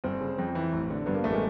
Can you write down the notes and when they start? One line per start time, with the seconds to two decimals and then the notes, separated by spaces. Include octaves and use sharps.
0.04 G1 C4
0.20 C#3
0.38 F2
0.55 E3
0.73 A1
0.90 D3
1.06 G2 B3
1.14 A#3
1.24 A1 A3
1.33 G#3